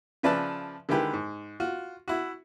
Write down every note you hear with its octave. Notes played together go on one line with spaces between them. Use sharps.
C#3 F3 B4 D5 E5 A5
D3 D#3 G#3 E4 G4 B4
G#2
F4 F#4
E4 F#4